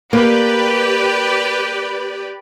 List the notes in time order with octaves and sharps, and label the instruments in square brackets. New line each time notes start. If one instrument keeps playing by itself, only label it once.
[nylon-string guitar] A#3 [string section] G4 B4 D5